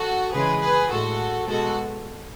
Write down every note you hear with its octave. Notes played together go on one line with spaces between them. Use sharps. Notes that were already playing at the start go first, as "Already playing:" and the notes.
Already playing: F#4 A4
C#3 E3 G#3 G#4 B4
G#4 B4
A2 G#3 F#4 A4
B2 G#3 F#4 A4